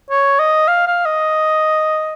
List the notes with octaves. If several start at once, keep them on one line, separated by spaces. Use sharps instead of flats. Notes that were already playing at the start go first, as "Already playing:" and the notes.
C#5
D#5
F5
F5
D#5